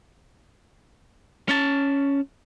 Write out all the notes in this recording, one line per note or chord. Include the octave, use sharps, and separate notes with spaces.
C#4 A5